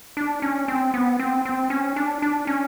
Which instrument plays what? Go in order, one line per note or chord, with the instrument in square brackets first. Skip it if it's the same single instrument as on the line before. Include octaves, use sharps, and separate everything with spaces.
[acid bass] D4
C#4
C4
B3
C4
C4
C#4
D4
D4
C#4